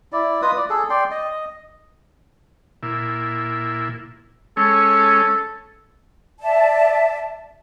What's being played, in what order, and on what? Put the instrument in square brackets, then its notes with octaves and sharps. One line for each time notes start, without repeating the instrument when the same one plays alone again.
[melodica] E4 D5
F4 B4 D#5 D#6
D5
G#4 A4
D5 G5 C6
D#5
[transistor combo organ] A#2 E4
[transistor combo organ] G#3 C#4 C#5 [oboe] A4
[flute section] D5 E5 A5